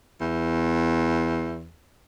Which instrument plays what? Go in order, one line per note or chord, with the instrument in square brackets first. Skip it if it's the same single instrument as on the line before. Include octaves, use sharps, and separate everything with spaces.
[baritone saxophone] E2